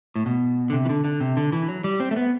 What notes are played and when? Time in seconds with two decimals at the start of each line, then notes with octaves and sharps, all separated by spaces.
0.16 A2
0.26 B2
0.70 D3
0.73 C3
0.85 E3
0.89 D3
1.04 D3
1.20 C3
1.37 D3
1.52 E3
1.69 F#3
1.84 G3
2.00 C4
2.11 A3
2.16 B3